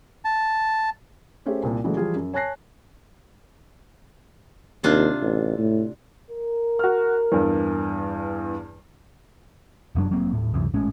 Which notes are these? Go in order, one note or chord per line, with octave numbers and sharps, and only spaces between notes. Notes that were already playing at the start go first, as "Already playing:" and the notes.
A5
A3 C#4 G4 G#4 C5 E5
C2 A#2
C#3 E3 F#3 G#3 A3
E3 F3 G3 F4 G#4
F#2
C#5 G#5 A5 F#6 A#6 C7
D#2 C3 D4 F4
A1
A2
A#4
F#4 F6
E2 G2
F1 F#2 F#3 D4
F1 F#3 A#3 C4
D#1 A2
C#2 F#2 C3 E3
G#1 A2 G#3 C#4